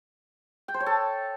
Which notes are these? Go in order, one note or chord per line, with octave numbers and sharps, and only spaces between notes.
G5
C5
C#5
A4